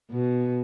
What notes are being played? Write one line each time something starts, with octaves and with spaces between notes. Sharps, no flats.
B2